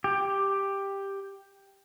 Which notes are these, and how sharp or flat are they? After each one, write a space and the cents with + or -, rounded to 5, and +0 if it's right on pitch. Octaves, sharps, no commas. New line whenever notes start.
G4 +5